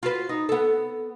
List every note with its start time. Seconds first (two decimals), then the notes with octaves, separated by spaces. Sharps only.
0.03 F4 F#4 B4
0.29 D#4
0.49 B3 A4